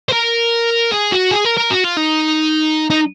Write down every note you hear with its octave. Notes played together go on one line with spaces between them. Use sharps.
C5
A#4
G#4
F#4
G#4
A#4
A#4
F#4
F4
D#4
D#4